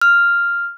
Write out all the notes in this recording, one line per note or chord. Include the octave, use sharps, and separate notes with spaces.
F6